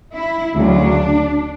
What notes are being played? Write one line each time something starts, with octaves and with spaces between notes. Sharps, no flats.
E4
D2 C#3 F#3 D4